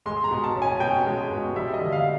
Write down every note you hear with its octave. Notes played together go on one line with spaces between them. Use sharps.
G#3 C6
A#5
B2
A5
C#4
G#5
B2 G5
G#3
B2
G3 E5
D#5
D3
F5